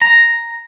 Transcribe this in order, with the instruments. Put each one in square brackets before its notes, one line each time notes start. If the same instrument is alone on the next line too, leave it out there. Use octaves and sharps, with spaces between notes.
[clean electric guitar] A#5